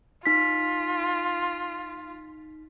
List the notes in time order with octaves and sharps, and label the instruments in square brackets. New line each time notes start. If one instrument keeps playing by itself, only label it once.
[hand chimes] D#4 B6 [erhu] F4